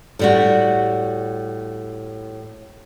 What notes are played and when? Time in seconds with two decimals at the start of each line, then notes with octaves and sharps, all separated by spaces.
0.19 A2 G3 F#4